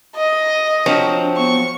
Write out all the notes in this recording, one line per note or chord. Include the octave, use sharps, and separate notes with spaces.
D#5
F3 F#3 C4 D4
B3 C#6